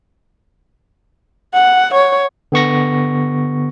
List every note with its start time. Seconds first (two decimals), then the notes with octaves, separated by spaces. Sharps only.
1.54 F#5
1.94 C#5
2.52 D3 B3 C#6 A#6